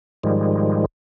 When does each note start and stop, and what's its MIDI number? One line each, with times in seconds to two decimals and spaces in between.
0.24 0.85 44
0.24 0.85 51
0.24 0.85 53
0.24 0.85 55
0.24 0.85 56